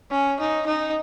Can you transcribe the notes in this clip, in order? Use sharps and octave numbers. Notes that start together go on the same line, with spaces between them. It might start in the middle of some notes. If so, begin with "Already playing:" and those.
C#4
D#4
D#4